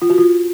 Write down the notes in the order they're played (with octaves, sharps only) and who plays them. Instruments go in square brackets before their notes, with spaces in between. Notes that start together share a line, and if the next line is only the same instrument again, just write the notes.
[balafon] F4
F#4
F4